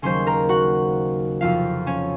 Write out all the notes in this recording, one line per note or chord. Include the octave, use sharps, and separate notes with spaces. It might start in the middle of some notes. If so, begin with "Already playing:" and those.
D#2 C#3 F#3 A#3 C#4 C5 C6
A#4 A#5
F#4 F#5
F2 C3 F3 C4 F4 F5
C#4 C#5